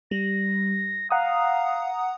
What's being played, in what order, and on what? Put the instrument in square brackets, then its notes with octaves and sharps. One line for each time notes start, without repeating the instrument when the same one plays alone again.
[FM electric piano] G3 [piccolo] A#6
[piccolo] F5 [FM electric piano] F#5 A#5 D#6